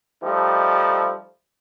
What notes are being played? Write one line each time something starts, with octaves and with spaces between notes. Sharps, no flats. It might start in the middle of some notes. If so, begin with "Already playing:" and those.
F3 G3 A3 D#4 G4